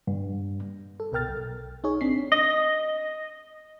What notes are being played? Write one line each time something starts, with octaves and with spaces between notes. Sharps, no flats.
G2
A4
C2 B2 A#4 G5 F6 A6
B1
D#4 G#4 C#5
A1 C4 D4 B6 C7
D#5